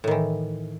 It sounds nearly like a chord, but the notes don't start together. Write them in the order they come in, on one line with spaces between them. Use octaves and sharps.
A2 D#3 E3